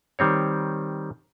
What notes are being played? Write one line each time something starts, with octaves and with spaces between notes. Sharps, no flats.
D#3 G3 C4 C#5